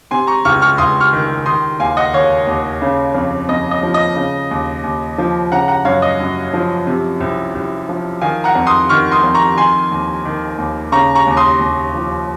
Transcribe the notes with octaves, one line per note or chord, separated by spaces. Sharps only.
C3 G#5 C6
A#5 C#6
C#2 C#6 F6
C#6 F6
C#2 C6 D#6
C#6 F6
D#3
D#3 C6 D#6
D#2 F5 G#5
D#5 F#5
D#3 C#5 F5
D#2
C#3
F2
F2 D#5
D#5
F3
D#5
C#3
D#2
D#2
F3
C#3 F#5 A#5
F#5 A#5
F#2 C#5 F5
D#5
F#2
F3
C3
C2
C2
F3
D#3 F5 G#5
F#5 A#5
F2
C6 D#6
D#3 C#6 F6
C6 D#6
F2
A#5 C#6
D#3 G#5 C6
D#2
D#3
D#2
C#3 A#5 C#6
A#5 C#6
D#2
C6 D#6
D#2
F3